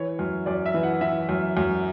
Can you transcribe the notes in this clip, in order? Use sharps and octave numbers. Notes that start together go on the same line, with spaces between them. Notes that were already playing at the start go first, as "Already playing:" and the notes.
Already playing: E3 C#5
F#2
F#2 D5
E5
E3
F#5
E3 E5
F#2
F#2